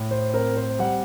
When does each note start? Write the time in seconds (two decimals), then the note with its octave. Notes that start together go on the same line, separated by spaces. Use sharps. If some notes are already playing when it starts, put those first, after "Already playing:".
Already playing: A2
0.11 C5
0.34 C4 A#4
0.57 C5
0.79 G3 F#5